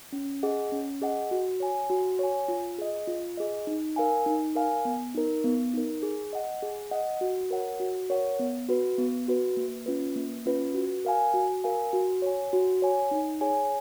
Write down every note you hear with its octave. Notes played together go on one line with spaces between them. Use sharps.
C#4
G#4 D#5 F#5
C#4
G#4 D#5 F#5
F#4
C#5 G#5
F#4
C#5 G#5
F4
G#4 D#5
F4
G#4 D#5
D#4
A#4 F5 G#5
D#4
A#4 F5 G#5
B3
D#4 A#4
B3
D#4 A#4
G#4
D#5 F#5
G#4
D#5 F#5
F#4
A#4 C#5 F#5
F#4
A#4 C#5 F#5
B3
F#4 B4
B3
F#4 B4
A#3
C#4 F4 B4
A#3
C#4 F4 B4
F#4
A#4 F5 G#5
F#4
A#4 F5 G#5
F#4
C#5 G#5
F#4
C#5 G#5
D#4
G#4 C#5 G#5